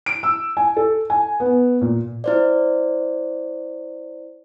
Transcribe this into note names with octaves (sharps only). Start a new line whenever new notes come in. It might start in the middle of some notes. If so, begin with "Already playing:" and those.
D7
E6
G#5
A4
G#5
B3
A#2
E4 C5 D5